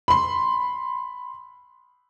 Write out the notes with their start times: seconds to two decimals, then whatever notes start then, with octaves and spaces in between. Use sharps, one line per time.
0.08 B5 C6